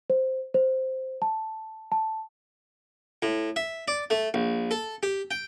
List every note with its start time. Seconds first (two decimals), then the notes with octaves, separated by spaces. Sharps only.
0.10 C5
0.54 C5
1.22 A5
1.92 A5
3.22 A2
3.56 E5
3.88 D5
4.10 A3
4.34 A#1
4.71 A4
5.03 G4
5.31 G5